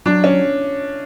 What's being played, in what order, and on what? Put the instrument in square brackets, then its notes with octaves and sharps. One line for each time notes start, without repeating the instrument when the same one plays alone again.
[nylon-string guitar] F#3 [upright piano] D4
[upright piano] C#4